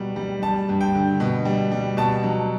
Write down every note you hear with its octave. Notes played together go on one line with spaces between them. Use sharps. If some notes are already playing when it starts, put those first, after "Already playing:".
Already playing: B2 F#3 G3
G3
G3 A5
G2
G5
D3
B2
G3
G3
B2 A5
F#3